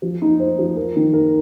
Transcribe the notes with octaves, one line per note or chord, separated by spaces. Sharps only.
F3
D#4
C5
F3
A#4
D#3
A#4